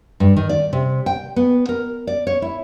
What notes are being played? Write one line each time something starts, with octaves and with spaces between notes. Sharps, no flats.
G2
D#3
D5
C3
G5
B3
A#4
D5
C#5
E4